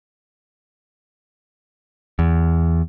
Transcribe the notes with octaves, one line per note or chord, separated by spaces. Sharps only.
E2